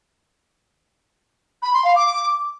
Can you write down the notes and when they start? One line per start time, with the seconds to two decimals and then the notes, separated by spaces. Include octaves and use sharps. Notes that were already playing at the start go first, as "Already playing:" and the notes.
1.62 B5
1.74 C6
1.85 F5
1.96 D6